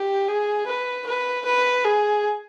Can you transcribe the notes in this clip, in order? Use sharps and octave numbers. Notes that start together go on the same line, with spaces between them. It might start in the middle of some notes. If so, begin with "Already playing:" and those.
Already playing: G4
G#4
B4
B4
B4
G#4